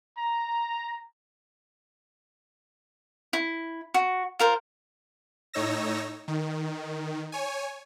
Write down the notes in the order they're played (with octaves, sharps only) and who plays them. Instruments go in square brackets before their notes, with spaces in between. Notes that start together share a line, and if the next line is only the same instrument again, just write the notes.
[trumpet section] A#5
[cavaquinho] E4
F#4
F4 A#4 C5
[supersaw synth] A2 D#4 C#5 E6 A#6
D#3
C#5 G#5